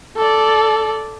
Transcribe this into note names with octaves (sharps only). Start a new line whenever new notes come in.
A4 D5